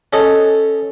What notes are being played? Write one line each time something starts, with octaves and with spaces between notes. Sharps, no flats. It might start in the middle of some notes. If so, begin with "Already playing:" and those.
C#4 A4 D#5